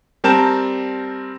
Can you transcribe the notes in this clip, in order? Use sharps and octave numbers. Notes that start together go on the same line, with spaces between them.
G3 C4 A#4 A5 G6 E7